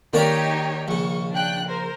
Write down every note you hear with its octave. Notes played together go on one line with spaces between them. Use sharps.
D#3 A#3 D4 D#4 G4 C#5 D5 A#5
A#1 C#3 C#6
D4 G5 F#6
A#4 C5